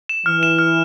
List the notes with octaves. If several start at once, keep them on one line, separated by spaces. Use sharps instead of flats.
E7
E3 F6
E7
F6